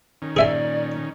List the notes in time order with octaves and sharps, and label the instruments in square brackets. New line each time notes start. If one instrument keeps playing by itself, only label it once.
[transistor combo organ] D#3 C#4
[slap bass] A#2 [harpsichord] G#4 E5 G#5 [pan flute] D5